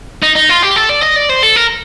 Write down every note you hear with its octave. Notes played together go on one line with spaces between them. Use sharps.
D#4
D#4
F4
G4
A4
D5
D#5
D5
C5
A4
A#4